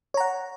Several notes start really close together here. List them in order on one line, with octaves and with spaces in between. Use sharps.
C#5 A#5 F#5